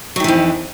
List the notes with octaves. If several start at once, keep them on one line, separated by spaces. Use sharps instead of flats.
F2 D#3 E3 F#3